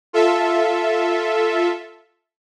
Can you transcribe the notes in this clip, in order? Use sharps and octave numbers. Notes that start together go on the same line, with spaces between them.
F4 A4 E5